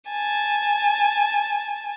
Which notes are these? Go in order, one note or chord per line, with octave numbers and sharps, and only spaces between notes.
G#5 A5